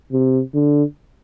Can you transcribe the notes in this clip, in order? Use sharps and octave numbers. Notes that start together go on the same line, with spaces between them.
C3
D3